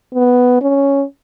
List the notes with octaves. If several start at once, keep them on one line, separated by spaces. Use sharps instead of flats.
B3
C#4